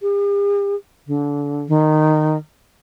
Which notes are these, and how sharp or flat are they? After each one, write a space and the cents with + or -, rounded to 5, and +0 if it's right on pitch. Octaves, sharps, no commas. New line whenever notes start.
G4 +45
D3 -25
D#3 -15